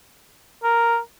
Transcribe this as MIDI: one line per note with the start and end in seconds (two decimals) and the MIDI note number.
0.63 0.98 70